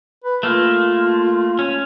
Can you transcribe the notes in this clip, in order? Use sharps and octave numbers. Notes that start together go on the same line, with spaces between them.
B4
A3 A#3 F4
C#4